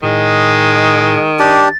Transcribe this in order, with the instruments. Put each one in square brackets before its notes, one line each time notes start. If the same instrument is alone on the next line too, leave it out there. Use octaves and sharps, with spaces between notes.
[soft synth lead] A2 [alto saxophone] D#3 [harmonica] G#3
[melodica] D4 G4 [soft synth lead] A6